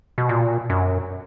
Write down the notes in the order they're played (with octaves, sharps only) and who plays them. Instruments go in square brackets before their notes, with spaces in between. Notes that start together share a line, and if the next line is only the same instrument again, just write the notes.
[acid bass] B2
A#2
F#2